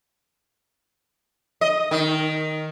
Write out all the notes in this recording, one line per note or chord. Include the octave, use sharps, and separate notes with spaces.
D#5
D#3